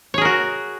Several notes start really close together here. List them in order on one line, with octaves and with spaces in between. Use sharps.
C#5 G#4 A#4 F#4